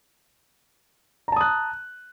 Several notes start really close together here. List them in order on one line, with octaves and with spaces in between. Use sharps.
A#5 A5 D#6 F#6